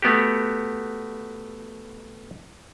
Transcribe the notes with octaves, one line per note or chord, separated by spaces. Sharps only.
A3 B3 F#4 G4